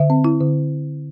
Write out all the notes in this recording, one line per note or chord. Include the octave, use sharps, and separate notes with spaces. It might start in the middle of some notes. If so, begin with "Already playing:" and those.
Already playing: D3 E5
C4
E4
D3